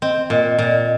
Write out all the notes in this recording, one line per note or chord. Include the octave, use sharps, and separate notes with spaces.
C4 D#5
A#2 D#5
A#2 D5